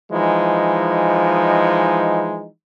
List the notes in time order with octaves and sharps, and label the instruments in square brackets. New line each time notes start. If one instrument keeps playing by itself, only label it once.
[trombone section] E3 F3 G#3 D#4